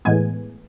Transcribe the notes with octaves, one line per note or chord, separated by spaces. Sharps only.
A2 E3 G#3 B3 G#5